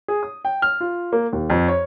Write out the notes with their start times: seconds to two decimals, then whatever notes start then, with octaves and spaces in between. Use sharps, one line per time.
0.08 G#4
0.23 D#6
0.45 G5
0.62 F6
0.81 F4
1.13 A#3
1.33 D#2
1.50 F2
1.68 C#5